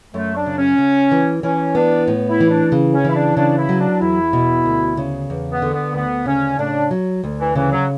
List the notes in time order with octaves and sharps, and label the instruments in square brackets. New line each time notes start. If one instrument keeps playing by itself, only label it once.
[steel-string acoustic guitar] F#2 [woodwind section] A3
[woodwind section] D4
[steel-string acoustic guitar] C#3
[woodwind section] C#4
[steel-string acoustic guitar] C#3
E3
[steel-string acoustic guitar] E3 [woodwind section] C#4
[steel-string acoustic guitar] B3 [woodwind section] D4
[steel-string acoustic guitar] A2
[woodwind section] E4
[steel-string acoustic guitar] E3
[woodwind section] D4
[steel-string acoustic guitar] C#3
[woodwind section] C#4
[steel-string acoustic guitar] E3 [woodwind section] E4
[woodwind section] D4
[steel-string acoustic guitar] C#3 [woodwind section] D4
[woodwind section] E4
[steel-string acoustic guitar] F#3
[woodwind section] D4
[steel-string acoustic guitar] E2 [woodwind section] E4
[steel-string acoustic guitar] B2
D2
C#3
E2
[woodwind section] B3
[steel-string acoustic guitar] D3
[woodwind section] B3
[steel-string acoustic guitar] D2 [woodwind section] B3
[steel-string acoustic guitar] C#3 [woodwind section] C#4
[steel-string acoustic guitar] A2 [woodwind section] D4
[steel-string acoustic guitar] F#3
D2
[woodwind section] E3
[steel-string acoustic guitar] C#3 [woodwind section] E3
[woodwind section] F#3